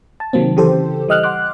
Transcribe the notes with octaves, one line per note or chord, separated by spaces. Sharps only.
A5
C3 D#3 F#3 A#3 C4
C#3 E3 G4 A4 C5
E3 G3 D#5 G5 F6 F#6
F#5 C6 D6 F#6